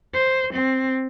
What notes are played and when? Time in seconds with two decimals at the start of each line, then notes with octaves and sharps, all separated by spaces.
0.13 C5
0.54 C4